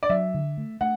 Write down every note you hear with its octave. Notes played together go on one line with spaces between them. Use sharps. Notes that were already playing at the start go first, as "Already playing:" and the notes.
D5
F#3 E5
D3
A3
A3 F#5